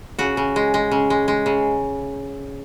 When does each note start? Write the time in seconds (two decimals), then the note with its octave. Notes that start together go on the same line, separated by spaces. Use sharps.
0.19 C#3 F#4
0.37 C#3
0.56 G#3
0.74 G#3
0.91 C#3
1.10 G#3
1.28 G#3
1.46 C#3